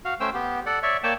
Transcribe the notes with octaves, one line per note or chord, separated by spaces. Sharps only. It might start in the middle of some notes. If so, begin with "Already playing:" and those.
F#4 F5
A3 C#4 C5 G5 E6
B3 G4
A4 D5 F#5
C#5 D5 E5
A#3 C#5 D5 G5 A5